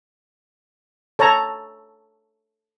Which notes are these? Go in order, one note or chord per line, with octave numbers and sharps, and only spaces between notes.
A4 C#5 A5 A#5